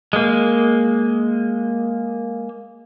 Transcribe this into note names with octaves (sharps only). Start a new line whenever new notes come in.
G#3 A#3